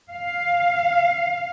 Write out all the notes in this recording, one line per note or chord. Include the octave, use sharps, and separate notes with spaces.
F5